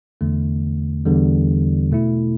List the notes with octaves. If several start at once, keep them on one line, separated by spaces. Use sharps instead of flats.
E2 D3 A3
E2 D3 G3
B2 A3 E4